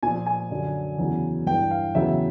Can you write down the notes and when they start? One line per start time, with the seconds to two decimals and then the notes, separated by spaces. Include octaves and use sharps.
0.03 A#2 F3 G#5
0.26 G#5
0.51 F#2 D3 F#3
0.98 E2 C#3 F#3
1.46 G2 E3 G5
1.71 F5
1.95 E2 C#3 F#3 E5